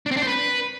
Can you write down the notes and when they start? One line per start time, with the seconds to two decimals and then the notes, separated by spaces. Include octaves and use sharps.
0.06 D4
0.11 C4
0.17 D4
0.22 C5
0.27 B4